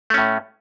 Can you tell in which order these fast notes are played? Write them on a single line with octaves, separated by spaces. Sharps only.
A3 C#4 A2